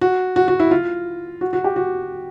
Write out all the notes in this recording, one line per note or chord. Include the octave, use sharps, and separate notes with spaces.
F#4
F#4
F#4
E4
F4
F#4
F#4
G4
F#4